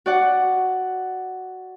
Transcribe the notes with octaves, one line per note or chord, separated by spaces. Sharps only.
F#4 D5 F#5